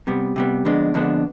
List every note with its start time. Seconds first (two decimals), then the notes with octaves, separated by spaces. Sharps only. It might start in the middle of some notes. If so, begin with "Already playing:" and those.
0.07 C3 G3 B3
0.36 C3 G3 B3
0.65 F2 D3 G#3 B3 D4
0.94 F2 D3 G#3 B3 D4